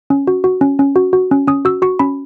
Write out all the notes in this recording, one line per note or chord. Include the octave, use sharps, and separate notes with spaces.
C#4
F#4
F#4
C#4
C#4
F#4
F#4
C#4
C#4 D#6
F#4 E6
F#4 C#6
C#4 B5